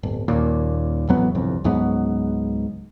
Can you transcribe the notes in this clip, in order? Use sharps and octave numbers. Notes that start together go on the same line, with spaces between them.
D1 G1
D#1 D#2 A#2
A1 F2 F#3 B3
G1 C2 F2
C#2 G#2 F#3 B3